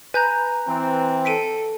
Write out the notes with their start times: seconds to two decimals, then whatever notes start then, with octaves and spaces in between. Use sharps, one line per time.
0.14 B4 G#5 A#5 G6
0.67 E3 C4
1.25 A4 B6 D7 D#7